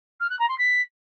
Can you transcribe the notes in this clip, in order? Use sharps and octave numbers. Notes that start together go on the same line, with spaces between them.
F6
F#6
A#5
C6
B6